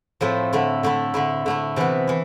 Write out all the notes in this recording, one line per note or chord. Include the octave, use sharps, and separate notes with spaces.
A2 F3 A3 C4 E4
D3 A3 E4
D3 A3 E4
D3 A3 E4
D3 A3 E4
C3 E3 B3 E4
E3 E4